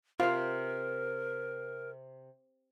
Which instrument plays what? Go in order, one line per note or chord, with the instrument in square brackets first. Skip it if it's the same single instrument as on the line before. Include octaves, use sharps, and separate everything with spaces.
[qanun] C3 C5 [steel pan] F4 F5 [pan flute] A#4